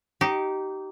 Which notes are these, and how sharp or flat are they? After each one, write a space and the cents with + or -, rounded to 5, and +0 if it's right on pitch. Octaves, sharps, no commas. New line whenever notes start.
D#4 +0 G4 -25